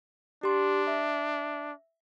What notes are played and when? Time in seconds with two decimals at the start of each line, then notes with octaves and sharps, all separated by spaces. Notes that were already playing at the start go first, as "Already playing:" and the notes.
0.43 D4 G4 C6
0.87 E5